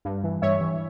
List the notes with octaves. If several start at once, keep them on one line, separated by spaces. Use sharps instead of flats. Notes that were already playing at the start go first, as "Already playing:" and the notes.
G2
E3
G2 C#5 E5
E3